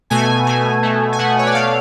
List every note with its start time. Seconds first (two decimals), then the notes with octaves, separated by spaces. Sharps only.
0.10 B2 A3 G#5
0.47 B2 A3 G#5
0.83 B2 A3
1.13 G#5
1.19 B2 A3 F#5
1.39 C#5
1.47 D5
1.54 B2 A3 F5